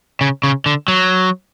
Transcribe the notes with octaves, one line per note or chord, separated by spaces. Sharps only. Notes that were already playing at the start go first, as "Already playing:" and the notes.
C#3
C#3
D3
F#3